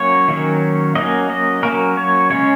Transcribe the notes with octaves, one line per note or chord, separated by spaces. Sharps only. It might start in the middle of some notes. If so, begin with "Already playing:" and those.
Already playing: F#3 A#3 C#4 C#5
D#3 F#3 A#3 C#4
F#3 A#3 C#4 D#5
D#5
F#3 A#3 C#4 A#4
C#5
C#3 G#3 C#4 C#5